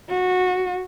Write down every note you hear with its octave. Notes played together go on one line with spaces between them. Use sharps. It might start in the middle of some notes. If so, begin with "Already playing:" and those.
F#4